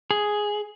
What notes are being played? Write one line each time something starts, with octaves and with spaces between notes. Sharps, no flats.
G#4